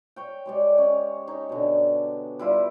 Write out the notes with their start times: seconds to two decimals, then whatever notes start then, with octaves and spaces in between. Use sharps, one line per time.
0.16 C#5 G5
0.46 G#3 G4 D5
0.78 C#4
1.27 D#4 C#5
1.49 B2 D3
2.39 G3 E4 F4